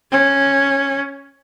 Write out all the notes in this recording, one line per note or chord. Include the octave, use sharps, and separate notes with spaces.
C#4